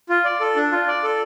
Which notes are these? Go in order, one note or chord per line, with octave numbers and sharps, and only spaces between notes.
F4
D5
A4
D4
F4
D5
A4